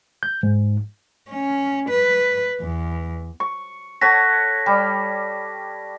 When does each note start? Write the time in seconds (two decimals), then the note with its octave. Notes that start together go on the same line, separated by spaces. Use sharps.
0.23 G6
0.43 G#2
1.30 C#4
1.89 B4
2.62 E2
3.40 C#6
4.01 A4 C#5 F#5 A5 A#6 B6
4.66 G3 G4